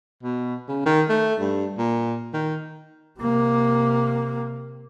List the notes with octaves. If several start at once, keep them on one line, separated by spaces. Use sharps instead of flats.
B2
C#3
D#3
A3
G2
A#2
D#3
C3 A#3